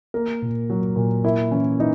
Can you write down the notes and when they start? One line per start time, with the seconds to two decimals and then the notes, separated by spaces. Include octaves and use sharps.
0.14 A#3 A#4
0.42 A#2
0.70 F#3
0.96 A#2
1.24 A#3 E4
1.51 E3 C#4
1.80 E3 D#4